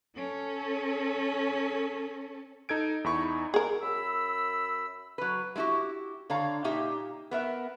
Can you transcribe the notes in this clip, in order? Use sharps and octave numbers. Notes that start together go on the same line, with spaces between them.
C#4 A4
D#4 A4 G#6 D7
E2 D#4 E4 B5 C#6
G#4 A#4
F#2 B5 E6
F#3 B4
G#3 A3 E4 F#4 G4
D3 C#5 F5 A#5
A#2 A#3 D#4 G4 E5
B3 A#4 E5